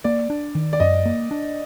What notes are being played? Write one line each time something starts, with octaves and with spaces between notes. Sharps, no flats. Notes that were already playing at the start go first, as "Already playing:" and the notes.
A#3 D5
D4
D#3
D5
F#2 D#5
A#3
D4